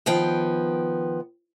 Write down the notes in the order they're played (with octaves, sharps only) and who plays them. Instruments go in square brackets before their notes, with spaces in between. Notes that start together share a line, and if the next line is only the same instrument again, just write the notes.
[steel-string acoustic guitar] D#3 F3 B3 G5